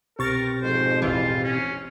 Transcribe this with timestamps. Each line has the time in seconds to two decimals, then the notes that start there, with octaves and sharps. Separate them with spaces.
0.19 C2 B2 C4 G4 A#4 C#6 A6
0.62 F2 G#2 C5
1.02 A1 E2 E3 F4
1.43 C#4